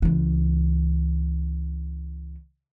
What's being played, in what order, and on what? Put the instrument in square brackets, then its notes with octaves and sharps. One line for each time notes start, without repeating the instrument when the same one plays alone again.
[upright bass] C#2 E3